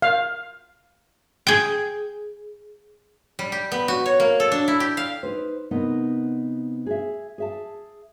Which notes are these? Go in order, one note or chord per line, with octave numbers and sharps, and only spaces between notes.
F5
G#4 G5
G3
G4
B3
F#4
C#5
A#3
A4
D4
E4
G4
F5
D#4 B4 C5
C3 B3 D#4 A#4
G#4 E5
G#4 E5 A5